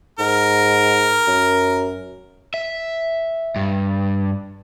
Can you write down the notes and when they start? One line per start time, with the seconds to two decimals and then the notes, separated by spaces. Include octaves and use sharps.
0.19 G#2 A#4
1.27 F#2
2.54 E5
3.56 G2